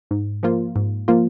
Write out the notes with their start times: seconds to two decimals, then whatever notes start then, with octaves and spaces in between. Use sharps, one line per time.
0.11 G#2
0.43 F3 A#3 F4
0.76 G#2
1.08 F3 A#3 F4